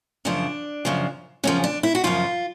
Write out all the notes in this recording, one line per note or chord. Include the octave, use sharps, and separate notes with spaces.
F#2 C#3 F3 D4
F#2 C#3 F3
F#2 C#3 F3 C#4
D4
E4
F#4
F#2 C#3 F3 F4